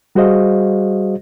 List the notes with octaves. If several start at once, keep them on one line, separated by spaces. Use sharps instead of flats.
G3 F#4 G#4 C5 D#5 F5